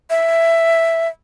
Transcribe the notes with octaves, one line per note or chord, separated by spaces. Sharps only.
E5